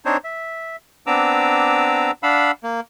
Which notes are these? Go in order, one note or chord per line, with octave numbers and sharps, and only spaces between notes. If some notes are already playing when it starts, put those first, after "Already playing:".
C4 D4 D#4 C5 C#5
E5
B3 C4 D4 A#5 D6 E6
D4 F5 F#5 B5 E6
A#3